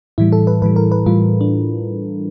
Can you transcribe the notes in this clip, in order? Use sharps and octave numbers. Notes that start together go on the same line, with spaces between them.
A2 E3 G3 E4
A4
B4
A2 E3 G3 B4
A#4
B4
A2 E3 G3 F4
D4